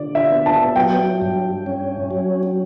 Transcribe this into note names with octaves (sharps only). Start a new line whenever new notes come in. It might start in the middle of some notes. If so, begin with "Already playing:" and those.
Already playing: D3 D5
E5
B3
A5
F#3 G5
G2
C#4
F#3